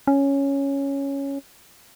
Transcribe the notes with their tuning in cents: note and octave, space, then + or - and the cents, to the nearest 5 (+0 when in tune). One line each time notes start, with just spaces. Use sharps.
C#4 +0